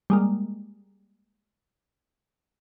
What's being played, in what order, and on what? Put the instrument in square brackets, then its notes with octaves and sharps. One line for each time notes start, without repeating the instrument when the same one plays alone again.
[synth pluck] G3 G#3 A#3